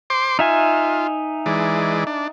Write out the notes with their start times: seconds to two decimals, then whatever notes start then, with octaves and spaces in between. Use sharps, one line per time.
0.10 C5 C6 D6
0.39 D#4 F4 E5 G#5
1.46 E3 G#3 D5
2.07 D4